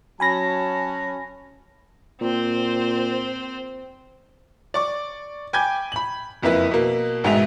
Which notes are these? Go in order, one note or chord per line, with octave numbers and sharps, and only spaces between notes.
F#3 C#4 G#5 A5 B5 A#6
A#2 C4 C5
D5 C#6 D6
G5 G#5 B5 D6 G6 G#6
B5 F#7
F#1 F2 A#3 E4 B4 B6
B2 A#3
A1 G#2 B2 G#3 E5 F7